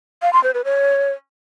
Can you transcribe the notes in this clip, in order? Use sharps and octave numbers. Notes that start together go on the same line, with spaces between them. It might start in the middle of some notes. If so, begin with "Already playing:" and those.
F5
C6
C5
B4
C#5